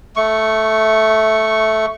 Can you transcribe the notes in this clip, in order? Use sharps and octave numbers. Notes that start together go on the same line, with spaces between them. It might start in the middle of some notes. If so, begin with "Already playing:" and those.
A3 C#6